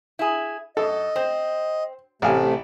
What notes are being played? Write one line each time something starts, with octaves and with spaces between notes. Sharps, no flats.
E4 G#4
F#2 A4 D#5
C4 C5
A1 C3 A3 E4 F5 G#5